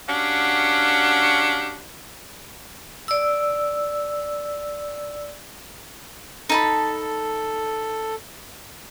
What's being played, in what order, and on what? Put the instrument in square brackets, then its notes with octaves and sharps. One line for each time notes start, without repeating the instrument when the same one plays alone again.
[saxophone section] C#4 D4 F#4 G4 F5 F#5
[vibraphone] D5 E6
[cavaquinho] D#4 A5 B5 [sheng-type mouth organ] A4